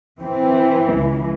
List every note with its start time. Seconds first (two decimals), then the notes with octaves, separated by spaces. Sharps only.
0.21 E3 C4
0.93 C#2